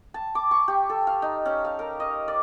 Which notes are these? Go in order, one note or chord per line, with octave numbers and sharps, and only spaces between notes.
A5
D6
C#6
G4
A4
F5
D#4
C#4
F5
A#4
D#5
D5